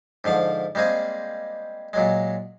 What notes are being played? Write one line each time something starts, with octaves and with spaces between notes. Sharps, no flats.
G#2 D3 F3 F5
G3 G#3 A#3 C4 G#4
A#2 F#3 G#3